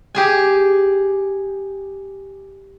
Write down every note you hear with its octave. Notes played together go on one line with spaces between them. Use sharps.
G4 G#4 G#5